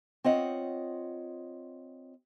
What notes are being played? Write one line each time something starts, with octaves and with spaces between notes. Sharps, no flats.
C4 F4 C#5 D#5 F#5